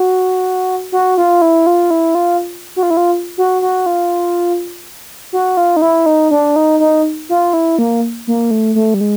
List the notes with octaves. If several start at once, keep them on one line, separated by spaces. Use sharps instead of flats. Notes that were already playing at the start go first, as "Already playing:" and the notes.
Already playing: F#4
F#4
F4
E4
F4
E4
F4
F#4
F4
E4
F4
F#4
F#4
F4
F#4
F4
D#4
E4
D#4
D4
D#4
D#4
F4
E4
A#3
A#3
A3
A3
G3
G#3